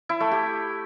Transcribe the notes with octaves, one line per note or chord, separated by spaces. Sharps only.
E4
A3
G4